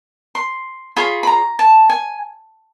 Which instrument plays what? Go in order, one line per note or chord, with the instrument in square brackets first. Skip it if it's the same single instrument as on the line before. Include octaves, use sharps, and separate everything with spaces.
[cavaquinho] C6
F4 G#4 C#5 B5
B5
A#5
A5
G#5